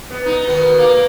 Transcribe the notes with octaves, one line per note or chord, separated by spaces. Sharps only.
B3
D#4
B2 D#3 B3
A#3